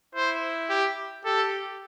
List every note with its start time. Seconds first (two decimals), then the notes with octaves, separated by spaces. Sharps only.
0.15 E4 C5
0.70 G4
1.25 G4 A4